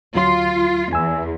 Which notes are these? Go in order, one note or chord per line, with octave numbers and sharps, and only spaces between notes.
D2 F#3 F4 C6
E2 G#5 E6